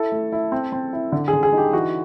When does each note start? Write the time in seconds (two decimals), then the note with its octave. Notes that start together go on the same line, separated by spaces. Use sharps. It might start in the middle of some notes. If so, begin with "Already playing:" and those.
Already playing: E4 A4
0.12 A3
0.32 E4
0.52 C4
0.72 C4
0.93 E4
1.12 D3
1.28 G#4
1.33 D3
1.43 G#4
1.53 D#4 G4
1.73 E3 F#4